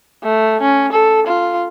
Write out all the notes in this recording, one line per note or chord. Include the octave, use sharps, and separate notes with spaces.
A3
C#4
A4
F4